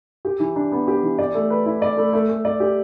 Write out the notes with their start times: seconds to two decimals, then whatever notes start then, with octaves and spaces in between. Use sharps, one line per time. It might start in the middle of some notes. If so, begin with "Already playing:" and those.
0.25 G4
0.40 E3
0.56 D4
0.72 B3
0.88 G4
1.03 E3
1.19 D5
1.34 A3
1.50 B4
1.66 E4
1.82 D5
1.97 A3
2.13 A3
2.29 A3
2.45 D5
2.60 G4